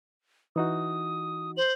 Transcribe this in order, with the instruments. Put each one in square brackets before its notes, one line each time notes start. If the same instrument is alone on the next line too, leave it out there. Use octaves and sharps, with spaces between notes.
[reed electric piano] E3 D#4 F#4 [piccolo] D#6
[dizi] C5 [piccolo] F#7